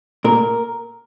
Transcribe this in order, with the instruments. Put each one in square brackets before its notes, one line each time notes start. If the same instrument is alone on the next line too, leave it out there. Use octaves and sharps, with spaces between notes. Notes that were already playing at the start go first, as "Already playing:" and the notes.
[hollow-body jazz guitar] A#2 A#4